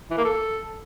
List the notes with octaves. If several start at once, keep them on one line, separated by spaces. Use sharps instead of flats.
E3
A#3
A4